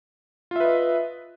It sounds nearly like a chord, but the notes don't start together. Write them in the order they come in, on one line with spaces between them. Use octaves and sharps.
F4 E5 B4 D#5